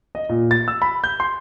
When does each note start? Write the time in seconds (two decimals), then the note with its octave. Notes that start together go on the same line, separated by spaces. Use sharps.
0.15 D#5
0.29 A#2
0.51 A6
0.68 E6
0.82 B5
1.04 G6
1.20 C6